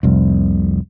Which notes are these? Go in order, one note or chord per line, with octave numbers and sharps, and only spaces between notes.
F1 C2